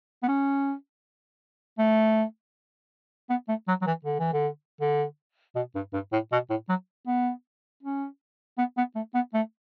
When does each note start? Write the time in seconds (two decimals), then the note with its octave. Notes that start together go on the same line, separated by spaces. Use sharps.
0.23 B3
0.28 C#4
1.78 A3
3.29 B3
3.48 A3
3.68 F#3
3.82 F#3
3.87 E3
4.05 D3
4.19 E3
4.33 D3
4.81 D3
5.55 B2
5.75 G2
5.93 G2
6.12 A2
6.32 B2
6.50 A2
6.69 F#3
7.07 B3
7.83 C#4
8.58 B3
8.77 B3
8.95 A3
9.14 B3
9.34 A3